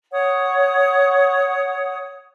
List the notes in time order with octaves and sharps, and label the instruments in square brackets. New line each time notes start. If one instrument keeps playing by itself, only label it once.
[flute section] C#5 F#5 D#6